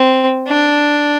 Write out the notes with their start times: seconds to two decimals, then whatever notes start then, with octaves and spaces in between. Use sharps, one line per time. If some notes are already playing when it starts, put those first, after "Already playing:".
Already playing: C4
0.48 D4